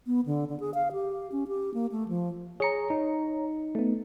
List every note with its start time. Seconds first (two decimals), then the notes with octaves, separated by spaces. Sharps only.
0.07 B3
0.26 D3
0.49 D3
0.60 G#4
0.74 F5
0.92 G4
1.32 C#4
1.48 G4
1.74 A#3
1.92 A3
2.08 F3
2.60 G#4 C#5 A#5 C#7
2.90 D#4
3.75 A3 B3